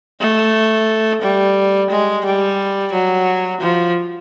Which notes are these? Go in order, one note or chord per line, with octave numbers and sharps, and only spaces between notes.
A3
G3
G#3
G3
F#3
F3